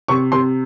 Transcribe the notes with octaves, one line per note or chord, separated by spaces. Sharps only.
C3 C#6
C3 C6